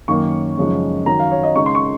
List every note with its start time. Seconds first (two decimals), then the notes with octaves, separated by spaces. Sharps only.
0.08 F#2 D#3 A#3 C#4 C#6
0.58 F#2 C#3 F3 G#3 D#4
1.06 D#3 F#3 C#4 A#5
1.20 F5
1.31 C#5
1.43 D#5
1.55 C#3 G#3 D#4 C#6
1.66 C6
1.75 C#6